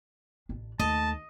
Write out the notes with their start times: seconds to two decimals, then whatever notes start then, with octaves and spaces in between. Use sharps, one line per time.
0.49 A1 D4
0.79 D#2 A3 D#5 A5